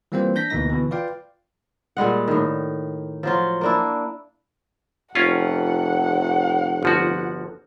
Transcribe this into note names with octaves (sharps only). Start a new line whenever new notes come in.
E3 G3 A#3 C4 F4 C5
D4 G6 A#6 B6
D2 B2 E3 A#3 D#4 A#6
B2 D3 E3
F4 B4 D5 F5 G5
A#2 G3 G#3 F#5
A2 D#3
F3 F#3 F4
A#3 D4 E4
F1 C#4 F4 F#5
G1 F3 F#4